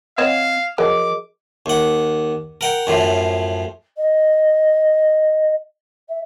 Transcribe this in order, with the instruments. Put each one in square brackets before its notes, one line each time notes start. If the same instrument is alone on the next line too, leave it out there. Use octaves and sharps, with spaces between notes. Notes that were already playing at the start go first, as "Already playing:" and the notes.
[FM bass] C4 [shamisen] C#5 D#5 F#5 [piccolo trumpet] F5 [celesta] G#6 E7
[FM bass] F3 [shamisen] F#3 [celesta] G#4 A#4 D#5 [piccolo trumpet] D6
[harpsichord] D#2 F#5
A#4 F#5 G5
F#2 A2 F3
[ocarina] D#5
E5